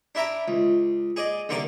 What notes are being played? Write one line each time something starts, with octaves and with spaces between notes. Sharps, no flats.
D4 E4 E5 A#5 D6
C#2
G#4 D5 D#5
C2 D3 A#3 A#4 D5 D6